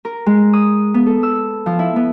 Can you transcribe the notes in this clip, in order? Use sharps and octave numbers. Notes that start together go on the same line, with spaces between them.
A#4
G#3
D#6
B3
A4
E6
F3
E4
B3